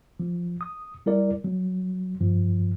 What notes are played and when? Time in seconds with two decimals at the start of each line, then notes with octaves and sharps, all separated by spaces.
0.20 F3
0.61 D#6
1.06 G3 E4 A#4 D5
1.44 F#3
2.20 G2 F3